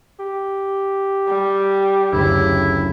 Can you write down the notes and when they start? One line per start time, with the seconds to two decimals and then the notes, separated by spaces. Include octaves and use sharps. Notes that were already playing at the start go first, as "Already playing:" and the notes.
0.19 G4
1.28 G3
2.12 F#1 D2 E4